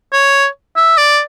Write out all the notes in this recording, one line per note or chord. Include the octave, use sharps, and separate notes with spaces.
C#5
E5
D5